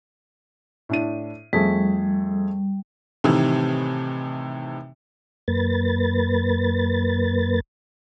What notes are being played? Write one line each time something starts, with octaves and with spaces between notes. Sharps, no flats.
A2 D4 D#7
F2 G3 A3 G#4
A2 C3 D#3 E3
F#2 A#3 B4 A6